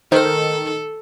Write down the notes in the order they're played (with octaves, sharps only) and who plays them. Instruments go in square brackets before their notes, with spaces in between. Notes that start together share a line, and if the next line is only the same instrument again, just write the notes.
[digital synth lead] D#3 [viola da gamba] A4 [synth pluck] A#4 C5